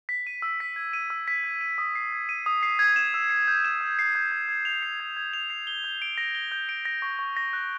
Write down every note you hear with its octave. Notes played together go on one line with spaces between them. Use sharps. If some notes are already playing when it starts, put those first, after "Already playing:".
B6
D#7
E6
B6
G#6
D#7
E6
B6
G#6
D#7
D#6
C7
G#6
D#7
D#6
C7
G#6
E7
E6
C7
G6
E7
E6
C7
G6
G#6
G#6
F7
C7
G#6
G#6
F7
C7
G7
G6
D7
A#6
G7
G6
D7
A#6
C#6
C#6
A#6
F#6